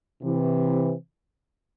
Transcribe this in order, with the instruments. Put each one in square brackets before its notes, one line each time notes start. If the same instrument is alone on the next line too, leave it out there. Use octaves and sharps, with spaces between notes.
[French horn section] C3 E3